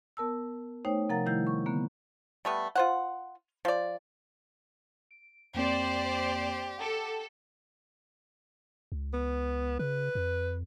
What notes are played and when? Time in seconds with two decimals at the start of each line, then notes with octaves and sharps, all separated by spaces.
0.17 B3 A#4 A5 E6
0.85 A3 D#4 C5 C#5 G5
1.09 C3 F3 A#4 F#5 A#5 A6
1.26 D#3 G3 A3 E4 G6
1.47 C#6
1.66 D3 A#3 B3
2.45 G3 A3 B3
2.75 F4 C5 F#5
3.65 F3 D5
5.11 D7
5.54 F2 A#3 C4 G4 C5 D5
6.78 A4 F#5 D6 D7
8.92 C#2
9.13 B3
9.79 C#3 B4
10.15 F2